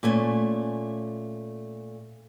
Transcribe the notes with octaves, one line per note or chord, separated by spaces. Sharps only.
A#2 A3 C#4 G#5